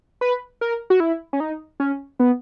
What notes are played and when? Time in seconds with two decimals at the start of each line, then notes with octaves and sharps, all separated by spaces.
0.21 B4
0.61 A#4
0.90 F#4
1.00 E4
1.33 C#4
1.40 D#4
1.80 C#4
2.20 B3